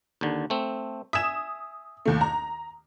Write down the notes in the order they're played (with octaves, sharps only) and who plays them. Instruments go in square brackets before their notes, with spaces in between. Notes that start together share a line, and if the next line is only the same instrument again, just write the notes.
[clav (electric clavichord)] D#2 D3
A3 C4
[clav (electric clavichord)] E5 G#5 [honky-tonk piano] D#6 E7
[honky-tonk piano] D#2 A3
A#5